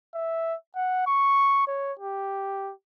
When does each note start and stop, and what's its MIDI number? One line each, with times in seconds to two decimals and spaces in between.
0.14 0.55 76
0.76 1.03 78
1.07 1.67 85
1.68 1.93 73
1.99 2.72 67